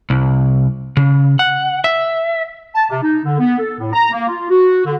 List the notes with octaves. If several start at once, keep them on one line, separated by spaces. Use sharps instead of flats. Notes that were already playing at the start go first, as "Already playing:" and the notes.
C2
C#3
F#5
E5
A5
C3
D#4
D3
B3
A4
A2
A#5
A#3
F4
F#4
D3